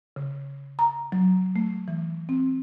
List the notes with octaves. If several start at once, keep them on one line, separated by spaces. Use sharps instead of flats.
C#3
A#5
F#3
A3
E3
C4